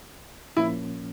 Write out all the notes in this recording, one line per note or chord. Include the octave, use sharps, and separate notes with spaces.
A#2 F3 A#3 C#4 E4